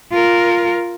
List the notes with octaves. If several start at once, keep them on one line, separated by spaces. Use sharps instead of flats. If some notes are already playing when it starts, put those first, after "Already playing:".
F4 A#4